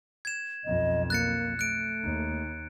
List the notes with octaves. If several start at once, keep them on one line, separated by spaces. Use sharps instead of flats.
G#6 E7
B1 F2 D#5
A#3 F#6 A6 C#7
A3 F#6 D7
D#2